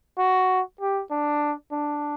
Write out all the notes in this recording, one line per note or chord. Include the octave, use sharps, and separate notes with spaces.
F#4
G4
D4
D4